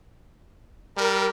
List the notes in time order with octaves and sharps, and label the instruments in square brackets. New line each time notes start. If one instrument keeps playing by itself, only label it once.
[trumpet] G3 [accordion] A#4